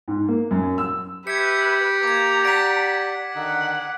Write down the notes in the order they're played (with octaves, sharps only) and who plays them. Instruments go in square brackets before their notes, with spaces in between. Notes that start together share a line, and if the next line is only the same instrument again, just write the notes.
[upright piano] G#2
A#3
F#2
E6
[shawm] G4 [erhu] B4 [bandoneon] E5 E6 [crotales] G#6 C#7
[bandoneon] A#3 [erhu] A#5 [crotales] D6 G#6
[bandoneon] D5 F#5 [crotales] B6 D7
[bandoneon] D3 D#3 D#4 [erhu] F#5